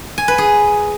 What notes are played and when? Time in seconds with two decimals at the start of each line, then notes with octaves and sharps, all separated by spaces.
0.18 G#5
0.28 B4
0.38 G#4